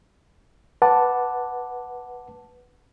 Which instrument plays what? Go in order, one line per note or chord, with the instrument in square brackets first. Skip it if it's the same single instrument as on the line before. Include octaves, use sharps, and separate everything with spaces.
[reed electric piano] B4 F#5 A5 D6